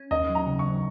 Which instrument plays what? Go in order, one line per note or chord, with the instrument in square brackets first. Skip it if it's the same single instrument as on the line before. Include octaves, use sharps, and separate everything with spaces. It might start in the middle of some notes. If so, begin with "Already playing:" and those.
Already playing: [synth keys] C#4
[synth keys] D#2 [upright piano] D#5
[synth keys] F#3
[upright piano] A#5
[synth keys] C#3
[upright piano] C#6
[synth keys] F#3